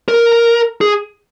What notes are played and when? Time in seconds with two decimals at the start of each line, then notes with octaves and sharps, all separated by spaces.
0.08 A#4
0.81 G#4